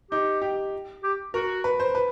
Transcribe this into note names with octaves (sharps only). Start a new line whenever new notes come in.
D#4 G4
G4
G4
F#4 A#4
B4
C5
B4